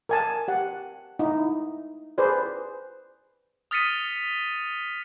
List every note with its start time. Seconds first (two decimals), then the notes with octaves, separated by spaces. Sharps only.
0.09 A#4 G#5 A5
0.48 G4 F#5
1.19 D#4 E4
2.18 G#4 B4 C5 D5
3.71 D#6 F6 A6 B6 C#7 D#7